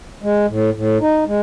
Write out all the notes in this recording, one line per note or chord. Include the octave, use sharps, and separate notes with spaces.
G#3
A2
A2
D#4
G#3